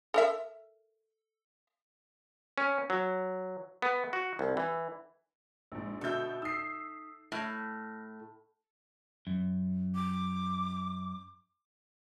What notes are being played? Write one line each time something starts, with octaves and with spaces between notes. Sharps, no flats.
A4 A#4 E5
C#4
F#3
B3
F#4
C2
E3
A#1 G#2 E6
B2 D3 A4 E5 G6
D#4 D#6 E6 B6 C7
A2 A5 F6 A#6
F#2
D6